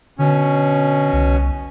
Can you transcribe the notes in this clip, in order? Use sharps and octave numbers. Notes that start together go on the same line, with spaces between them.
B2 D3 C#4
C2